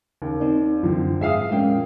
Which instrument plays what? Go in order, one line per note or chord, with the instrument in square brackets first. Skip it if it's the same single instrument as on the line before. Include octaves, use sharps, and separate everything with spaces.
[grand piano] D#2 [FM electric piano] C#3
[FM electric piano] C4 D#4 D5
[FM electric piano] F#2 [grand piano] D3 F3 C4
[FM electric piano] G#2 G#4 C7 [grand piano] E5 F5 D#6
[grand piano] F2 A#2 G5 [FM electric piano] G#3 C#4